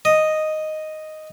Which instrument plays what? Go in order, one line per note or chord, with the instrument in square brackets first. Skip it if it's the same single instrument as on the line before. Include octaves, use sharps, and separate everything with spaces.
[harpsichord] D#5